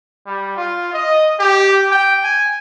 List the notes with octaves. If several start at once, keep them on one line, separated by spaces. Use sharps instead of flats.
G3
F4
D#5
G4
G5
G#5